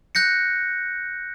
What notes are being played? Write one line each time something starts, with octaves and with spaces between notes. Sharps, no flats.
F#6 G6 A#6 C#7